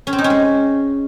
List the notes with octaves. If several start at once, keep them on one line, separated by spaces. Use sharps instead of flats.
C#4
C4
D#4
C#4
G#3